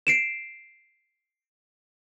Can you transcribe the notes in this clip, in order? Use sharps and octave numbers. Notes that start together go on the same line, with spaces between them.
C7 D7 E7